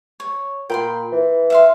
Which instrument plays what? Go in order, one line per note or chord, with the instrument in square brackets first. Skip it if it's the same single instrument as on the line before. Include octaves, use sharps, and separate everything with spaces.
[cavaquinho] C#5
[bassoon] A#2 [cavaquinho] G5 B5 C6
[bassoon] E3
[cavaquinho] E5 F5 C6